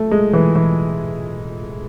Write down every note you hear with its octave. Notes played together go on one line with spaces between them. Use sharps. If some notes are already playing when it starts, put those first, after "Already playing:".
Already playing: A3
G#3
E3
E3